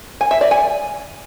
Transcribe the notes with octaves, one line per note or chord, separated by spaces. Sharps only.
G#5
E5
D5
G#5